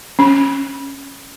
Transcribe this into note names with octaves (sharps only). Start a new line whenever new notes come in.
C#4